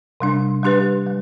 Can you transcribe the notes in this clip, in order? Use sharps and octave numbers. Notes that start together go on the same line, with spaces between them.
C3 G3 D4
G3 D4 G4 B4
G3